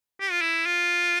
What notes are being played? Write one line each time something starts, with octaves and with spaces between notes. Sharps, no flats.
G4
F4
E4
F4